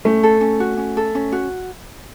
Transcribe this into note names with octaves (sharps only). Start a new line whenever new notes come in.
A3 C#4
A4
C#4
F#4
C#4
A4
C#4
F#4